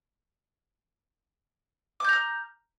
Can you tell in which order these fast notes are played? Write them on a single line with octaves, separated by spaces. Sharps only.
D6 G6 A#5 F6